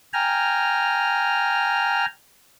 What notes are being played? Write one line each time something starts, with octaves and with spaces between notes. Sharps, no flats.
G5 G#5 A#5 F6